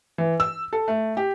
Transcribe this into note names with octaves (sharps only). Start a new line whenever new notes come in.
E3
E6
A4
A3
G4